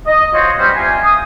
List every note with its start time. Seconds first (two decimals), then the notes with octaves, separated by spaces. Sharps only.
0.07 D#5
0.34 F4 F#4 C5 C#5 D#5
0.59 G3 B3 C#4 C5
0.76 C3 F4 G#5
1.03 D#6